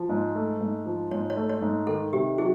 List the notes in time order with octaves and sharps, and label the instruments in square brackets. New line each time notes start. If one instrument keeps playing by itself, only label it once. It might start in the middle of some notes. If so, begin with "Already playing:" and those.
Already playing: [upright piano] F3
G#2
A3
G#2
F3
[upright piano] G#2 [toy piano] C#5
[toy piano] C#5
[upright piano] A3
[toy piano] C#5
[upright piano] G#2
[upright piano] D#3 [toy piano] A4
[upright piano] C3 [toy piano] G4
[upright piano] F#3 [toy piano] G#4